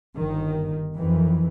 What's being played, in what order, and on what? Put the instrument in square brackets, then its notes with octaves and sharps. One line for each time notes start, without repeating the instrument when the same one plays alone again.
[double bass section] G1 D#3
F2 D#3 E3